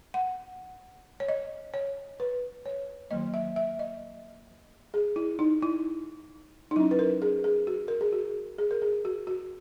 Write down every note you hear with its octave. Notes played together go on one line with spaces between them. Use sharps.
F#5
C#5
D#5
C#5
B4
C#5
D#3 F#3 A#3 D#5
E5
E5
D#5
G#4
E4
D#4
E4
D#4
F#3 C#4 E4
B4
A#4
G#4
G#4
F#4
A#4
G#4
F#4
G#4
A#4
G#4
F#4
F#4